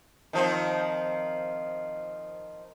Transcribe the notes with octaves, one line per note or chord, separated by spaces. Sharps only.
D#3 F3 C4